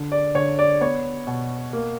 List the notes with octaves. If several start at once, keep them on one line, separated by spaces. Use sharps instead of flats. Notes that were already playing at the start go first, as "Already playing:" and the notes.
Already playing: D3
D5
D3 C#5
D5
B3 C#5
B2
A#3